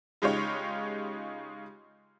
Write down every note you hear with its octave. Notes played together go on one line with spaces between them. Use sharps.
C#3 G#3 D#4 F4 G4 C#5